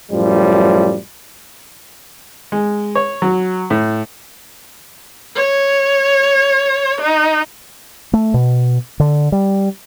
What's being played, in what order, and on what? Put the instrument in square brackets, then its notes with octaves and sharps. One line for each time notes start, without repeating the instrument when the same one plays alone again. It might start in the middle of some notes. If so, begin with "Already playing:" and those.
[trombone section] F#2 A2 F3 G3
[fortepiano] G#3
C#5
F#3
A2
[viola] C#5
D#4
[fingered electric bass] A3
B2
D3
G3